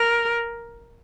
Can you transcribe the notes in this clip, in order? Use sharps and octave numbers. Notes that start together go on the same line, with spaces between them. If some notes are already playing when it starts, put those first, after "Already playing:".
Already playing: A#4